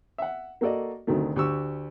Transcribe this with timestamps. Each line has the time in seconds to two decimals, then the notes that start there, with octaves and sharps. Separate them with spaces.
0.18 E5 F#5
0.61 A#3 F#4 A4 D5 D#5
1.07 D2 C3 D#3 F#3 A3
1.36 D2 G4 C#6 E6